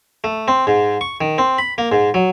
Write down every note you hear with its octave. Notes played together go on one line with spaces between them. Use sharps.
A3
C4
G#2
C#6
D#3
C4
B5
A#3
G#2
F#3